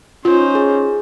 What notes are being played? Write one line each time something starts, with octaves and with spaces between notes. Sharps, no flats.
C#4 D#4 F4 C5
G#4